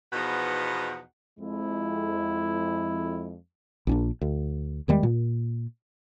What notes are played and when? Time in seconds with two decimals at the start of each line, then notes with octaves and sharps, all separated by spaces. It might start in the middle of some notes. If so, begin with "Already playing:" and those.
0.13 E2 B2 F3 D#4 B4 F#5
1.39 F2 G#3 E4
3.87 A#1 C#4 D4
4.21 D2
4.88 E2 D#3 G3 G#3
5.03 A#2